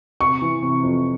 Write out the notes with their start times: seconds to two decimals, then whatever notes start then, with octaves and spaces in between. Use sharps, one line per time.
0.21 C3 C#6
0.42 E3
0.62 C3
0.83 F2